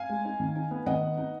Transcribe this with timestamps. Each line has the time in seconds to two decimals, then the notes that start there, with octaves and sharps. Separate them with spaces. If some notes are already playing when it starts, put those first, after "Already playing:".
Already playing: F5 G#5
0.10 G#3
0.25 D#4
0.40 D#3
0.56 D#4
0.71 B3
0.86 D#3 D#5 F#5
1.02 B3
1.18 D#4